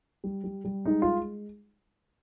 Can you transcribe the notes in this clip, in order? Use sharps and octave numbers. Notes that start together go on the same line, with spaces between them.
G3
G3
G3
G#3 D#4
G#3 F4